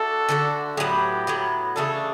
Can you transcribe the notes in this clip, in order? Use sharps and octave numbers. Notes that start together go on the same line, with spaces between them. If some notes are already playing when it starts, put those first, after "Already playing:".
Already playing: A3 D4 F#4 A4
D3 A3 D4 F#4
A2 F#3 B3 G4
A2 F#3 B3
C#3 E3 A3 D4 A4